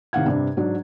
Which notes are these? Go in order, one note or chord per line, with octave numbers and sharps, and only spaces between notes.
A2 C3 D#3 F5 F#5 G#6
G2 C3 D4
G#2 F#3 D4